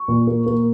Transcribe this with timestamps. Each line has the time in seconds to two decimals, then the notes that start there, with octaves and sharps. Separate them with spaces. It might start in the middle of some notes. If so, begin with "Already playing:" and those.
Already playing: C#6
0.08 A#2
0.27 A#3
0.46 A#3